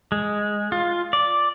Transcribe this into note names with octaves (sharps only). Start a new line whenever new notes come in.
G#3
F4
D5